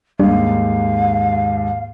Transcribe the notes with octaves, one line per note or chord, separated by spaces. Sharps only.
D#2 G#2 G3 D4 F5